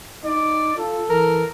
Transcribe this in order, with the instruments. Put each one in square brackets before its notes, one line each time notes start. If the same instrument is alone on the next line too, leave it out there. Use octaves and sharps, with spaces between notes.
[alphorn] D#4 [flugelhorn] D5
[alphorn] F4 [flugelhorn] A4
[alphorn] E3 [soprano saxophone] A#4